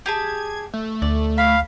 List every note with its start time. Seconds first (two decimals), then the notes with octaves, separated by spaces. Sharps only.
0.06 G4 G#4 A5 G#6
0.73 A3
1.02 D2 D5
1.38 F5 B5